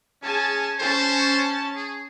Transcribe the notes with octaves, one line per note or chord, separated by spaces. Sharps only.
C#4 G#4 G#5 A5
C#4 C5 A5
G#4